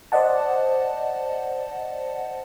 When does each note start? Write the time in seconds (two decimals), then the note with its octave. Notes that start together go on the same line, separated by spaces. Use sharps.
0.12 C5 D5 D#5 F#5 A5